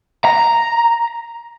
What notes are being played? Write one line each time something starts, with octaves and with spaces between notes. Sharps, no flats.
A#5